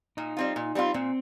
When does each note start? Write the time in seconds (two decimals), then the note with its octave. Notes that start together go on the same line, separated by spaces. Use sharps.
0.17 A#2 D#4
0.37 G3 C4 F4
0.56 A#2
0.75 G3 C4 F4
0.94 A#2 C4